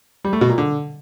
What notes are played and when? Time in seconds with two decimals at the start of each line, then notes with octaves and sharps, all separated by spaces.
0.25 G3
0.33 A3
0.41 B2
0.49 A#2
0.58 D3